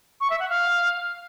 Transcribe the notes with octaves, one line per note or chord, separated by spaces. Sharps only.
C#6
E5
F#5
F5